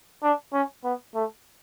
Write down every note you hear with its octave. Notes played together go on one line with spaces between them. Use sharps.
D4
C#4
B3
A3